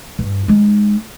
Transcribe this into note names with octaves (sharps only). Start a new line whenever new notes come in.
G2
G#3 D#4